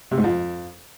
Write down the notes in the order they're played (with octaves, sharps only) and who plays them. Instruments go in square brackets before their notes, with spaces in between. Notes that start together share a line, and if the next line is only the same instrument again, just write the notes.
[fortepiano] C3
G#2
F2